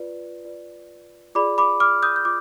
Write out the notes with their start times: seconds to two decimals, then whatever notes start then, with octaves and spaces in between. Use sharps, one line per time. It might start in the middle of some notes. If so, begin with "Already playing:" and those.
Already playing: F4 B4 D5
0.45 F4 B4 D5
1.35 F4 G#4 D5 B5 D6
1.58 B5 D6
1.80 D6 F6
2.03 D#6 G6
2.16 G6
2.25 F4 D6